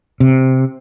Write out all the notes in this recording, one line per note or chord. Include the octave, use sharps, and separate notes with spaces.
C3